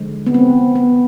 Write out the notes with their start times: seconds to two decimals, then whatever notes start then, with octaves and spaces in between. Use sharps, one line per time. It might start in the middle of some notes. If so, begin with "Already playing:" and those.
Already playing: D3 F3 G#3
0.26 B3
0.34 C4
0.75 B3